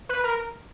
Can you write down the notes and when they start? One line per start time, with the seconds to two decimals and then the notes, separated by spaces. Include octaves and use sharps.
0.09 B4
0.24 A#4